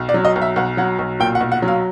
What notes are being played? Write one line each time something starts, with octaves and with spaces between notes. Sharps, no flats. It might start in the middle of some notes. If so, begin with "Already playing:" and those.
Already playing: B1
D5
F#3
D#5
B1
E5
B1 F#5
F#3 F#5
B1
A#2 G5
F#5
B1
F#5
F#3
F5